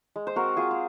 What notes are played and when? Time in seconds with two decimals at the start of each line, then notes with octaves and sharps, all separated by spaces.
0.16 G#3
0.27 C5
0.36 C4 F#4 A#4
0.57 C4 F4 G#4
0.71 G#4